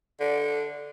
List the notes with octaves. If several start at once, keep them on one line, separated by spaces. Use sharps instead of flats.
D3